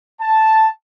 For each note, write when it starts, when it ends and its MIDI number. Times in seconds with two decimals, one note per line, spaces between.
0.21 0.66 81